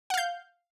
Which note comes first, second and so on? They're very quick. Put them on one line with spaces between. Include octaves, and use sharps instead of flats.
F#5 F5 G6